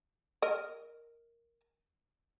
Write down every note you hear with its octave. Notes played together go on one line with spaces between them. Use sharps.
A#4 D#5